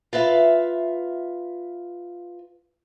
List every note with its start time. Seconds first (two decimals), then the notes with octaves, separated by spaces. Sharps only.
0.13 F4 B4 E5 F5